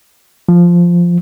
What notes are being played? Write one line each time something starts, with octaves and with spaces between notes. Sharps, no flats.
F3